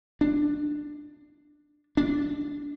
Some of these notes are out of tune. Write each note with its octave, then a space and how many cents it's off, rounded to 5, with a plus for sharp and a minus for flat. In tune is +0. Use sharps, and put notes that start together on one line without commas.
D4 +10
D4 -20